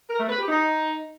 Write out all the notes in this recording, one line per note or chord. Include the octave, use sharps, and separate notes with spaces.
A#4
A3
B4
G4
D#4